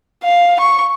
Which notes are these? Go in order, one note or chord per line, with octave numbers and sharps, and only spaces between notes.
F5
C#6